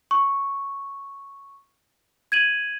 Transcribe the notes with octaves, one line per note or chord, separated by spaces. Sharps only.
C#6
G#6 D#7 F#7